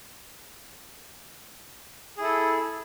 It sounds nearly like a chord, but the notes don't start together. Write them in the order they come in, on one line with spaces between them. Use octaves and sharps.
G#4 E4 A4